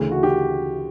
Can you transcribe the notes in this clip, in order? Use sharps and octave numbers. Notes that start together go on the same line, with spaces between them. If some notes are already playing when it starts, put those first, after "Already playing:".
Already playing: D2 C#3 E3
F#4
G4